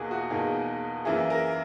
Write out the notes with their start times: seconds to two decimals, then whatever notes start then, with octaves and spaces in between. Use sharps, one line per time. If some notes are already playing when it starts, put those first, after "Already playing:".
Already playing: E2 B2 A#3 D#4 F#4 G#4
0.11 F#4
0.30 E2 B2 A#3 D#4 G#4
1.05 F#2 E3 A#3 E4 G#4
1.30 A#4